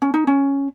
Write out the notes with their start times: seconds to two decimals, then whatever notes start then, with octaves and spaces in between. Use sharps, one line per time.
0.02 C#4
0.14 D#4
0.27 C#4